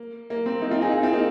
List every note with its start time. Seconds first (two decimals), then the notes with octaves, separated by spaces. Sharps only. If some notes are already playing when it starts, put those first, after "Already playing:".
Already playing: A#3
0.30 A#3
0.46 C4
0.62 A#3 D#4
0.71 C4 F4
0.81 D#4 G#4
0.92 D#4 G#4
1.03 C4 F4
1.13 A#3 D#4